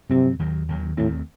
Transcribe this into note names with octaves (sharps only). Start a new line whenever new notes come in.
G2 C3 F#3 C4
D#2 D#3 F#3
D#2 D#3 F#3
D#2 A2 D#3 A3 C4